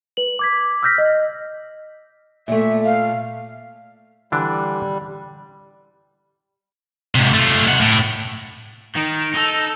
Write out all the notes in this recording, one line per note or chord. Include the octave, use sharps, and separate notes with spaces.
B4 F#7
D6 G#6 B6
E6 F6 G6 A#6 B6
D#5
A#2 A3 E5
F5
D3 E3 G3 D4
G#2 C3
A3 F4
C3 F#5
A2
D#3 D#4
D#4 A4